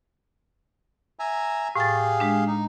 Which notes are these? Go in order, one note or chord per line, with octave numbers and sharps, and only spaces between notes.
E5 G#5 A#5
A2 G4 G#4 F5 A6
G#3 D4
D#4